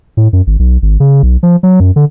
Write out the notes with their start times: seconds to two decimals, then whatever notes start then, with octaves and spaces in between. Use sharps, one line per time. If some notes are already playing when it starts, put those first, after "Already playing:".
0.17 A2
0.33 F#2
0.47 G#1
0.59 B1
0.82 G#1
1.00 C#3
1.23 B1
1.43 F3
1.63 F#3
1.80 F#2
1.96 D3